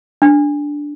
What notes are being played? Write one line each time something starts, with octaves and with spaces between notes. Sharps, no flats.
D4